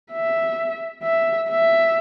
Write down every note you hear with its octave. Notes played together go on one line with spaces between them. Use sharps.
E5
E5
E5